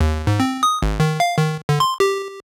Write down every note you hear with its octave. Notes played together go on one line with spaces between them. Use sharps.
D#2
G#2
C4
D#6
G#1
D#3
F5
D#3
D3
C6
G4